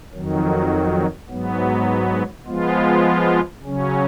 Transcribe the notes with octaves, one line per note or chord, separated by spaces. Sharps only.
F2 D#3 F#3
G#2 F#3 B3
F3 G#3 B3 F4
C#3 F#3 C#4